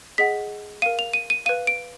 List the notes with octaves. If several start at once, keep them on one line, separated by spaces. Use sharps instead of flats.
G#4 D#5 F#5 B6
A#4 F5 D#7
F7
D#7
D#7
B4 F5 D#7
D7